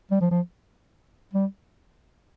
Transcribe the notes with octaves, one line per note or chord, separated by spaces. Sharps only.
G3
F3
F3
G3